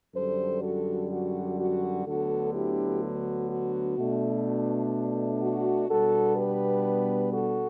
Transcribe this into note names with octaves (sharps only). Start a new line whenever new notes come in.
F#2 D3 G3 A4 C5
F#4 A4
F#4
F#4
D2 D3 F#3 B3 F#4 A4
E4 G4
F#4
F#4
B2 A3 D4
F#4
B2 G3 B3 D4 F#4 A4
G4 B4
F#4 A4